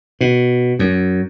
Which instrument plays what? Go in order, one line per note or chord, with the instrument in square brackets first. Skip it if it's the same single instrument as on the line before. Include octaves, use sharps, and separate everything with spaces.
[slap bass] B2
F#2